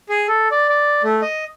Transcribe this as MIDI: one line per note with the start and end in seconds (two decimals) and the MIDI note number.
0.09 0.27 68
0.28 0.48 69
0.51 0.67 74
0.69 1.02 74
1.04 1.21 57
1.22 1.45 75